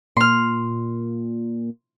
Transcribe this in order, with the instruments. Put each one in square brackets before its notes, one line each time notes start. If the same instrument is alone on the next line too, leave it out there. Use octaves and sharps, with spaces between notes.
[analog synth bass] A#2 [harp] C6 F6